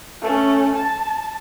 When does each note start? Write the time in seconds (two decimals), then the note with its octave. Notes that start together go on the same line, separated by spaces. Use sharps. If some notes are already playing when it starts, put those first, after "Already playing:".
0.21 A3 C#4
0.75 A5